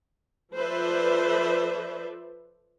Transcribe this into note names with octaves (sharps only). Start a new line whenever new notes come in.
F3 A4 B4 C5 D5 E5